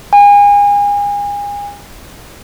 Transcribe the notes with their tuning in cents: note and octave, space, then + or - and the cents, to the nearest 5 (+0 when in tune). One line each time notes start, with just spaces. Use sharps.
G#5 -35